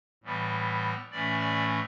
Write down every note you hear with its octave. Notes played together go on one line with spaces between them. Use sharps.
A2 E3 G3 B3
A2 E3 A3 C#4 D5
D5